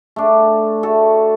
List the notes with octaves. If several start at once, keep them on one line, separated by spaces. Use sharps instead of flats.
A3 D4
A3 F#4 A4